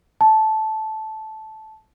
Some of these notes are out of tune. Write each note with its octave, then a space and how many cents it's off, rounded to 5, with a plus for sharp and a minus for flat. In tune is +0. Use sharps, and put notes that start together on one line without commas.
A5 -10